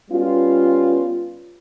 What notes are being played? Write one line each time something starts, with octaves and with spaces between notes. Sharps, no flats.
G3 B3 C#4 F4